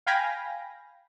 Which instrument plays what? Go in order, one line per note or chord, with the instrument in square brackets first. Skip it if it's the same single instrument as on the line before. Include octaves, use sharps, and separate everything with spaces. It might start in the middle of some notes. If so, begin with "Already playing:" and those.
[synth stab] F5 G5 G#5 B5 A#6